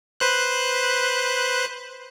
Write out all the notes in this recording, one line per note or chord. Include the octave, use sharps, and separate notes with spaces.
B4 C5 F#6